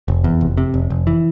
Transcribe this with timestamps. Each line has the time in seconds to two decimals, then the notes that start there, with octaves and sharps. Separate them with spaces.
0.08 F1
0.24 E2
0.41 F1
0.57 C3
0.74 F1
0.90 F1
1.07 E3